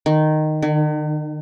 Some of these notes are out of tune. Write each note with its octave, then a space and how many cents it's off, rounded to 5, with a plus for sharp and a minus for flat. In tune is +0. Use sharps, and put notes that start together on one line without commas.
D#3 -10
D#3 -45